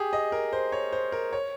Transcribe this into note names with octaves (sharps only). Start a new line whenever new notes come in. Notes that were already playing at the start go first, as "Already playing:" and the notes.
Already playing: G4 G#4
D#5
A#4
C5
C#5
C5
A#4
C#5